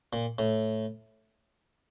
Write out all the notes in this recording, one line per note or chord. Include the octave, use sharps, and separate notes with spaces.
A#2
A2